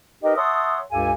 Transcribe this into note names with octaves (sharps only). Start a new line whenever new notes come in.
D#4 G4 A#4 B4 D#5
C#5 E5 F#5 A5 C6 D#6
C#2 G2 G4 A4 F5 G#5